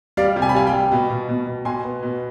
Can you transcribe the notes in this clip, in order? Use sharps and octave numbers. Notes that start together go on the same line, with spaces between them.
G3 D5 F5
C3
G#5
B5
G3 F5 G#5
G5 B5
G3
B2
B2
B2
B2
B2 G#5 C6
B3
B2